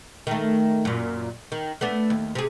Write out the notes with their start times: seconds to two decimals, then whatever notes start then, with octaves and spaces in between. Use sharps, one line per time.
0.27 D#3 A3
0.85 F#2 A#2
1.52 D#3
1.81 A3 B3 D4
2.10 D#2
2.35 C3 G#4